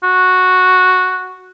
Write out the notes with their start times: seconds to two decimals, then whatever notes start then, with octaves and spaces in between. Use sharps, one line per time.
0.04 F#4